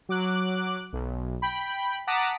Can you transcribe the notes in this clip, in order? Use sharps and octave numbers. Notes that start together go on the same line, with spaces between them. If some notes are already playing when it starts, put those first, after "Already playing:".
F#3 D6 F#6
B1
G5 B5
F#5 A5 A#5 D6 D#6 B6